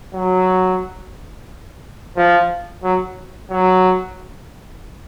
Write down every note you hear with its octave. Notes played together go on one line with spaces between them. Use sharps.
F#3
F3
F#3
F#3